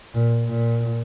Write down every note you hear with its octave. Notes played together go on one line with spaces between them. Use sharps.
A#2
A#2